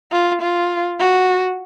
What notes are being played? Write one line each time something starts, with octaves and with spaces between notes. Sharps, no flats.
F4
F4
F#4